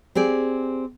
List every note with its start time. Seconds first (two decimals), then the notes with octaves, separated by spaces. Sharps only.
0.15 C4 G4 G#4 D5